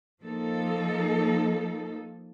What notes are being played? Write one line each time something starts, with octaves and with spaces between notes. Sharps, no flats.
F3 A#3 D#4 A4